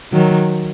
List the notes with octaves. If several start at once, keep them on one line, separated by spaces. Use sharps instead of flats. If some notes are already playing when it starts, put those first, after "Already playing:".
D#3 F#3